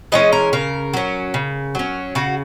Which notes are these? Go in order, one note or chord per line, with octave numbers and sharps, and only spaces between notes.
E3 G#3 C#4 D#5
A#4
C#3 A#4
F#3 C#4
C#3
F#3 C#4
C#3 F#4